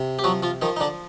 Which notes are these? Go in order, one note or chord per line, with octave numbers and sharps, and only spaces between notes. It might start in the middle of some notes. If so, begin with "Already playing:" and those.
Already playing: C3
G4
F3 F#3 F#4
F3 F4
D#3 F3 D#4
D#4
D3 D4